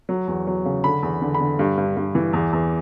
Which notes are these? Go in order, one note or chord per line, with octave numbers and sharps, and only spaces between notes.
F#3
E2
F#3
C#3
D3 B5
E2
D3
B5
D3
G2
G2
G2
E3
E2
E2